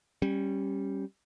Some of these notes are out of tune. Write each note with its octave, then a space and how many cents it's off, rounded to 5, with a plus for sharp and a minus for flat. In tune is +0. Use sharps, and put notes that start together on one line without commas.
G3 +0 C#4 -20